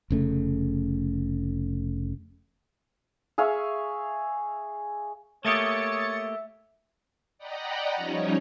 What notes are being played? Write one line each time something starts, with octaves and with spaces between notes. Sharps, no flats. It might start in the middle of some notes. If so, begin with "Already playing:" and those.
F1 C#3 A3
G#4 E5 F5 C#6
A3 A#3 G4 C#5 E5 D#6 A6 C#7
D5 D#5 F#5 G5 A#5 B5
F3 G3 C#4 D#4 C#5